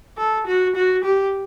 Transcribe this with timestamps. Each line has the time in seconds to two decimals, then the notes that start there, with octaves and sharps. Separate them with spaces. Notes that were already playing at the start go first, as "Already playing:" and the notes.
0.18 A4
0.47 F#4
0.76 F#4
1.04 G4